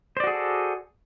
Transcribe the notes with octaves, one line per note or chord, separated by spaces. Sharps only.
F#4 G#4 A4 C5 D5